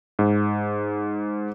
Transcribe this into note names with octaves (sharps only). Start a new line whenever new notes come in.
G#2